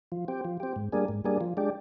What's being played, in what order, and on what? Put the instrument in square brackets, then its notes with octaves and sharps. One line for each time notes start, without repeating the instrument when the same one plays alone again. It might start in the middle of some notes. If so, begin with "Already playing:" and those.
[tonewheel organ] F3
C4 G4
F3
C4 G4
G#2
G3 A#3 D4 G#4
G#2
G3 A#3 D4 G#4
F3
G#3 D4 G4